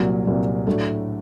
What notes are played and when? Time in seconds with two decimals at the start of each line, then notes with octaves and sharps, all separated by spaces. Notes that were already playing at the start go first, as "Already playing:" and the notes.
Already playing: C2 A#2 F#3
0.25 C2 A#2 F#3
0.67 A2 F#3 A3 D4